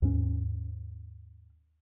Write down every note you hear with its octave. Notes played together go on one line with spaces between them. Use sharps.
D#2 G#2 C#4